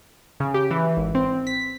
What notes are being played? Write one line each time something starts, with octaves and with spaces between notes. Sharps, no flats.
C#3
G4
E3
G#1
C4
B6